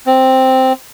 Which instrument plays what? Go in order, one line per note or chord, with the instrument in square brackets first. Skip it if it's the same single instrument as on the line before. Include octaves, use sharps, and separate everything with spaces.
[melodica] C4